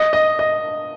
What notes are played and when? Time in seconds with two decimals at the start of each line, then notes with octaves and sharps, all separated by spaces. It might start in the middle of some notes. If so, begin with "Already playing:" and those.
Already playing: D#5
0.13 D#5
0.39 D#5